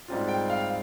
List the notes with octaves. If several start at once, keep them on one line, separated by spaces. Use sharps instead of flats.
G#2 G3 C4 F4
G5
F5